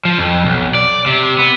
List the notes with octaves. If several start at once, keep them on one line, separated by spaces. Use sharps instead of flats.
F3
F2
B1
D5
C3
B3